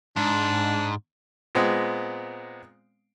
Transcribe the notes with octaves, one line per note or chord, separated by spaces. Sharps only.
G#2 D4
A#2 G#3 B3 C4